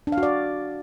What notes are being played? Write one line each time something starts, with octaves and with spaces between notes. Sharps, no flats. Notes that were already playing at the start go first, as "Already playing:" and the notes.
D4
F5
F#4
D5